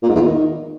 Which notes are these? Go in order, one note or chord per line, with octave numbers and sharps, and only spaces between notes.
A#2
G#2
E2
A#2
D#3